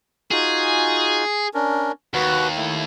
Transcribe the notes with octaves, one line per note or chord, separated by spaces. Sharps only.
D#4 F4 F#4 G#4
C#4 D4 A#4
D#2 F#4 B4 F#5
A3 E4